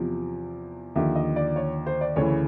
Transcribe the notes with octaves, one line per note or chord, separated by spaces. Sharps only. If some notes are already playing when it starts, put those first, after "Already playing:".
Already playing: E2 C3 F3
D#2 D3 F3 E5
D#5
D5
C#5
C5
D5
D2 C#3 E3 C#5